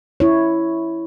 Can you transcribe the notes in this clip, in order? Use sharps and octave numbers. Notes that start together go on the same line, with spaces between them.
E4 C#5